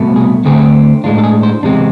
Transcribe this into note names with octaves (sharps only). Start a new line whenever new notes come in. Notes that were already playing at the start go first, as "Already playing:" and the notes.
Already playing: C2 B2 A3
G#4
D2 D3 A3 C4 G#4
A2 G#3 D4 F4
A4
G#4
C5
E2 C3 G#3 C4 D4